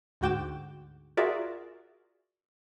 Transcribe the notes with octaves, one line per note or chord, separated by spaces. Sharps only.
D2 G#2 F#4 G5 D6 E7
F4 F#4 G#4 A#4 D5 E5